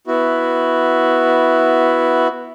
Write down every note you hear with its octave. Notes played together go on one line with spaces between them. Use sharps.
B3 E4 F#4